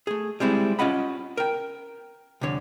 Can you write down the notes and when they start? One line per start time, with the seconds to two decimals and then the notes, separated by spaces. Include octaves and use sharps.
0.07 A3 G#4
0.40 G3 G#3 C4 E4
0.79 C#4 F4 D#5 F#5 B5
1.37 A#4 G5
2.41 C2 F2 D3 C#5